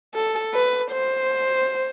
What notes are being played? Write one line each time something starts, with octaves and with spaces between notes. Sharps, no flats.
A4
B4
C5